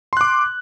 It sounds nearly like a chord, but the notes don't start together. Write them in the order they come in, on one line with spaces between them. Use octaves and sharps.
C6 F#6 D6